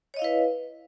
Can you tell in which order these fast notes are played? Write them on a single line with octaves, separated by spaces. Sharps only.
C#5 D#5 F5 E4 B4